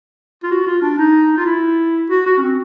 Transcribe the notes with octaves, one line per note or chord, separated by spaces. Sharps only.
F4
F#4
F4
D4
D#4
F4
E4
F#4
F#4
C#4
C4